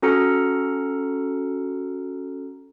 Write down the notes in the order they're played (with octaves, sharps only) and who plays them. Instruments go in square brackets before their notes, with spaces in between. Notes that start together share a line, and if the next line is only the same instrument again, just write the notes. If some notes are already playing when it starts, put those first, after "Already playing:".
[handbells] C#4 F#4 A4 A#5 F6 C#7